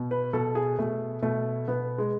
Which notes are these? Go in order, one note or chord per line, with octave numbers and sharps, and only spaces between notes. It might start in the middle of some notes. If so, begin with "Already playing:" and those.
Already playing: B2
B4
B2 A4
G#4
B2 A3
B2 A3
B2 B3
G#3